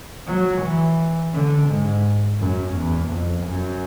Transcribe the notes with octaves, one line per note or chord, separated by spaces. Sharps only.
F#3
E3
D3
G#2
F#2
E2
F2
F#2